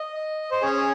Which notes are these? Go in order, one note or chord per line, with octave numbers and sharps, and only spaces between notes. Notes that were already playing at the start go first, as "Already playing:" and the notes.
Already playing: D#5
C5
C#4 G#4 C#5